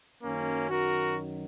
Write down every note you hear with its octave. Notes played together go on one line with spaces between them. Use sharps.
F#2 D#3 F#3 A#3 C#4
F#4 A#4